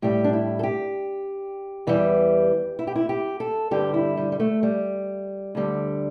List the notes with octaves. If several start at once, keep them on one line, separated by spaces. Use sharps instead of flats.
A2 G3 G4
D4
E4
A4
G4
E2 E3 G3
E4
G4
E4
G4
A4
G2 D3 G3 G4
E4
G3
G3
A3
G3
D2 D3 G3